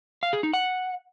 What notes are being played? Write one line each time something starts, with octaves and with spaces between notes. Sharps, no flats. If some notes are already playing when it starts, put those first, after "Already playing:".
F5
G#4
D#4
F#5